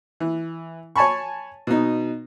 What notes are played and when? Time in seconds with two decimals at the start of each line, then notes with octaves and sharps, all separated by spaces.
0.20 E3
0.96 C#5 G#5 A5 B5 C#6
1.67 B2 D#4